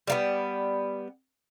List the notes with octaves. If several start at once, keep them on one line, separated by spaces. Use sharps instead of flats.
G3 A#3 B3